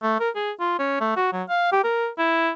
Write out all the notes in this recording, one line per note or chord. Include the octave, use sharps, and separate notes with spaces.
A3
A#4
G#4
F4
C#4
A3
F#4
F#3
F5
G4
A#4
E4